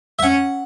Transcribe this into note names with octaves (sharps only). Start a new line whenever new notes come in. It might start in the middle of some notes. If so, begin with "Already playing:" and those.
E5
C#4 F#5